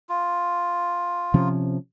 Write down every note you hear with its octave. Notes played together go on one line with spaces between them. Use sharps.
F4
C3 F3 C#4